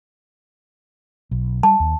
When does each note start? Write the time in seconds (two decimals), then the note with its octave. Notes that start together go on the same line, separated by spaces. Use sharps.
1.31 B1
1.63 G3 A5
1.80 D#2